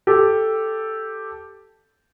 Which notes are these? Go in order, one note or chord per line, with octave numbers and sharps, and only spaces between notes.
G4 A4